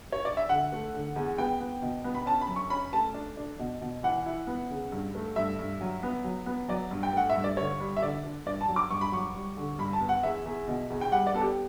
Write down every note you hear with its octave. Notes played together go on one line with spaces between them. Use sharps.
C#5
D5
E5
D3 F#5
A3
D3
E2
B3 G5
B3
B2
B3
B5
C#4 A5
B5
F#2
C#6
C#4 B5
A3 A5
D4
D4
B2
B2
E3 F#5
E4
B3
C#3
G2
A3
G2 E5
G2
F#3
B3
F#3
B3
F#3 D5
G2
G5
A3 F#5
E5
G2
D5
D3 C#5
G3
E5
D3 D5
D4
G2 D5
A5
F#3
D6
G2 C#6
B5
F#3 C#6
G3
D3
G2 B5
A5
B3
F#5
E2 E5
E2
B2
E2
G5
G3 F#5
D5
B3 A4
G4